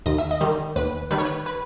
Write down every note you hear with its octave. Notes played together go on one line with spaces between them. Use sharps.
D#2 D#5
E5
D#5
D#3 G3
D#2 B4
D#3 G3 B4
C#5
B4
B4